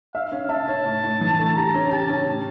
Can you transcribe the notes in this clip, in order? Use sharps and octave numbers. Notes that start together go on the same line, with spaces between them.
E5 F5
C#4
E5 A5
C#5
A2
A2
E3
A3
G4 A#5
C#4
G4 A5
C#4
A2